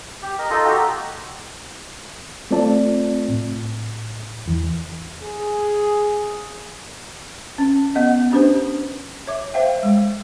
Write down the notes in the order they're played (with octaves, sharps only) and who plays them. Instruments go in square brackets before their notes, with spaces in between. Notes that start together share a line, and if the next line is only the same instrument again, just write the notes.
[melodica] G4
A#4 D#5
D#4 F4 A4 D#5
F#4 G4 A4
[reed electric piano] A3 C4 F4 D5 A5
A2
E2 E3
[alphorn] G#4
[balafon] C#4
B3 D#5
C#4 D4 G4 B4 C5
C#5 E5 D6
C5 E5 F5 G5
G#3